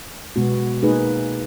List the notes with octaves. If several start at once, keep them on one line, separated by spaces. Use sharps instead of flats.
B2 G#3 B3 F#4
A#3 D#4 G#4 B4